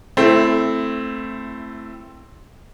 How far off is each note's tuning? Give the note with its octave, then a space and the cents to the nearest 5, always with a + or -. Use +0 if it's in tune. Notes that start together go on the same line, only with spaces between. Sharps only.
A3 +0 C4 +0 E4 +20